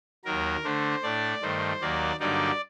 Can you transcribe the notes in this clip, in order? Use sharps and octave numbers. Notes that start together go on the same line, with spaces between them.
D#2 D#3 F#3 A#4
D3 A3 D4 C5
A2 A3 D4 D5
G2 D#3 A3 C5
D#2 D#3 F#3 A#3 D5
G2 D3 F#3 A#3 D#4 D5